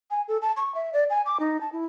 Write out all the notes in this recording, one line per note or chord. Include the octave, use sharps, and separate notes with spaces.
G#5
A4
A5
C#6
E5
D5
G#5
D6
D#4
A5
E4